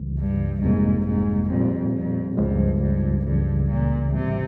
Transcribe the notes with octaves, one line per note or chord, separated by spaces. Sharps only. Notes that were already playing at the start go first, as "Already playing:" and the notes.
Already playing: C#2 C#3 E3 G3
G2
G1 F2 G#2 C3 G3 A#3
G#2
F2 A#2 G3 C4
F2
C#2 G2 C#3 F3 G#3
G2
C#2 G2 C#3 E3
A#2
G#1 G#2 C3 E3 G3